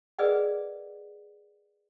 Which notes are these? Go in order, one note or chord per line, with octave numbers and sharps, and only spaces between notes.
G#4 A#4 B4 D5 D#5 F#5